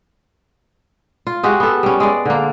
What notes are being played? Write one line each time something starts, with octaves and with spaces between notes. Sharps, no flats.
F4
G#3 F#4 G4
B3 A4
G3 C#4
G#3 D5
D3 A#3